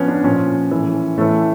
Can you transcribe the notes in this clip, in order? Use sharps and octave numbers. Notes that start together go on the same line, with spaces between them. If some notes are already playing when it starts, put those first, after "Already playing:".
Already playing: F3 B3 C#4
D4
A#2 F3 C#4
A2 E3
A2 E3 A3